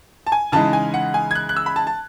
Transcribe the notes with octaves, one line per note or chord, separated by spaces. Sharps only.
A5
G#5
C#3 E3 G#3 D#4 A5
G#5
F#5
G#5
G#6
F#6
F#6
E6
B5
A5
A5